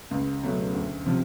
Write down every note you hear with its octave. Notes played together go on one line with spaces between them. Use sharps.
C#2
B2 F#3 A3
D2
C3 F3